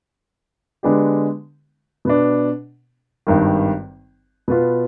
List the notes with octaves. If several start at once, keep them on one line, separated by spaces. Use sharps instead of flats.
D3 G#3 B3 D4 G4
B2 B3 D4
G#1 G2 D#3
B2 B3 F4